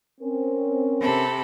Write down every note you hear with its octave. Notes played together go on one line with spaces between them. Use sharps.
C4 C#4 A#4
C3 A4 B5